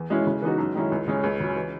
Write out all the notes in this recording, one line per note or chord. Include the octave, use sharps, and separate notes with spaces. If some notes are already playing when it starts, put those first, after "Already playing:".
Already playing: E2
B2 G#3 C#4 E4
C#3
E3 B3 D#4 F#4
F#2
D#3 G#3 C#4 E4
C#2
C#3 G#3 C#4 G#4
C#2
C#3 F#3 C#4
E3